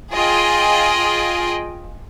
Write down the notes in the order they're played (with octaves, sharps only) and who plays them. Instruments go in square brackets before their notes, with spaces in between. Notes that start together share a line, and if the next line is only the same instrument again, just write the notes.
[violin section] F4 G#4 D#5 G5